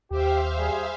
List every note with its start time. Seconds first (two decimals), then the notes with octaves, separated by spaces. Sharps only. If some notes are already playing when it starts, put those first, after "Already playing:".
0.11 D#2 G4 C5 E5 F5
0.58 G3 G#4